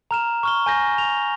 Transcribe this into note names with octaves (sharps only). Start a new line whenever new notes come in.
A#5 F6 E7
C#6 F6 G7
G#5 G6 A#6
F7